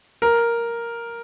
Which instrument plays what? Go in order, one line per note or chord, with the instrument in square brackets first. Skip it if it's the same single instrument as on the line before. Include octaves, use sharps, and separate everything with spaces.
[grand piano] A#4